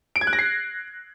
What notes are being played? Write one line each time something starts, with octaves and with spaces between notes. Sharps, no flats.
D7
G#6
F#6
A#6
C7